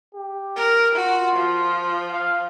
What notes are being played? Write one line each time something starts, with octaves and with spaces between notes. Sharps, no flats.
G4
A#4
F4 F#4
F3
F5